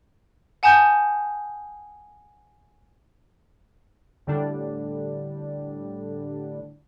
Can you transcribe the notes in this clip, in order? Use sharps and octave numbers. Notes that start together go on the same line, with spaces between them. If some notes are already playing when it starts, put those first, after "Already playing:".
F#5 G#5 A5 D#6 G6
A2 D3 G3 D4